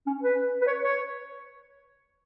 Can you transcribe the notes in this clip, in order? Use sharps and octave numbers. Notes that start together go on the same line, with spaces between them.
C#4
B4
B4
C#5
C#5